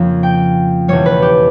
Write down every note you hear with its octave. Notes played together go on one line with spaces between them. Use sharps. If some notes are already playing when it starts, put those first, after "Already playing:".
Already playing: F2 C#3 F3 A#3
G5
E2 B2 G3 C#5
B4
G4